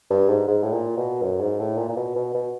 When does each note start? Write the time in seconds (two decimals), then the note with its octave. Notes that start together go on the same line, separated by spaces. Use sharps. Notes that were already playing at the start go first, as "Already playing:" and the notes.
0.10 G2
0.29 G#2
0.48 G#2
0.63 A2
0.73 A#2
0.97 B2
1.22 F#2
1.41 G#2
1.59 A2
1.77 A#2
1.89 A#2
1.97 B2
2.16 B2
2.34 B2